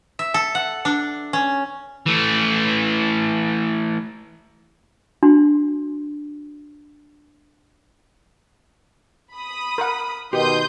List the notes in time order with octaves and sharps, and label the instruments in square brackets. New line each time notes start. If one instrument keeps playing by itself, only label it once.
[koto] E5
A4
F#5
D4
C#4
[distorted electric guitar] E3 A3
[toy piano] D4 F#4 C6
[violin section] B5 D#6
[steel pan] A#4 F#5
[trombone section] B2 D#3 [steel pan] G4 [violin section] C6 D#6 G6